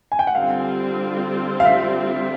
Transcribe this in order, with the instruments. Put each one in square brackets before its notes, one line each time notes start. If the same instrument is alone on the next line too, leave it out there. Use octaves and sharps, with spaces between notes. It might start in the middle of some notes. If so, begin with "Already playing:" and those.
[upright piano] G#5
G5
F#5
[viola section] D3 G3 C4 F4 [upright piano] F5
[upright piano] F5
E5